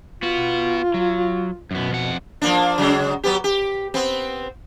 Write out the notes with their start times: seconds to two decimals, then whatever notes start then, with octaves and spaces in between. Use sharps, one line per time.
0.23 B3 F4 F#4
0.94 F#3
1.71 F#2 B2 B3
1.91 F2 F#5
2.42 F3 A#3 D4
2.78 C#3 F#3 G#3
3.24 F#3 B3 G4
3.44 G4
3.94 B3 C4